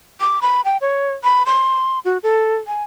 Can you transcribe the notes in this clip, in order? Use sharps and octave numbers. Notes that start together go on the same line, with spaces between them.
D6
B5
G5
C#5
B5
C6
F#4
A4
G#5